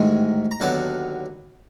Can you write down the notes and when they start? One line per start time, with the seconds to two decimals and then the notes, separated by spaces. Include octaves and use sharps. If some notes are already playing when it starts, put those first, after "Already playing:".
Already playing: A1 G#2 D#3 G#3
0.51 A#5
0.60 D#2 D3 F#3 B3 A5